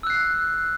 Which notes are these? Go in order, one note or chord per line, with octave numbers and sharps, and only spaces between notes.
E6 F#6 C7